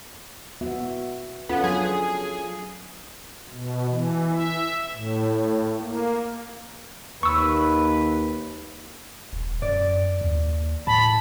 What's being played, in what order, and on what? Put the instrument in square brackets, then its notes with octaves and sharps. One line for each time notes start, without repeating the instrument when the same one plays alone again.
[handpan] B3 F#4 E5
[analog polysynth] B3 [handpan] C#4 F4 A4
[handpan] F#3 D4 [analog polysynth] G#4
[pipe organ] B2
E3
E5
A2
A#3
[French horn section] D#2 [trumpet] B4 [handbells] C#6 E6
[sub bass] D#1
[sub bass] F#2 [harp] D5
[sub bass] D#2
[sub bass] A2 [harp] A5 [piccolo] B5